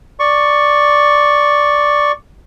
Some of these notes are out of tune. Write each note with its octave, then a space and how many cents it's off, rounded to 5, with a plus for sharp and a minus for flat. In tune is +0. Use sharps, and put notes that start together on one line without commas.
D5 +0 C#6 +0